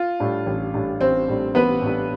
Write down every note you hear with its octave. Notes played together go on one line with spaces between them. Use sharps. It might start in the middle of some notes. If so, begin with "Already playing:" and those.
Already playing: F4
A2 G3 D4
A1
A2 G3 D4
A1 C4 C5
A2 G3 D4
A1 B3 B4
A2 G3 D4